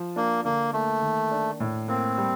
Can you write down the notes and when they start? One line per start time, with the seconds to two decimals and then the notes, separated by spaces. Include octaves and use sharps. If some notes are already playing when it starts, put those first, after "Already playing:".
Already playing: F3
0.16 A#3 D4
0.45 D3 A#3
0.73 A3 A#3
1.02 D#3
1.31 D4
1.60 A2
1.88 A#3 C4
2.18 G3